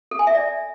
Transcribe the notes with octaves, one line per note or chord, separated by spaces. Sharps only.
A4
G#5
E5
D5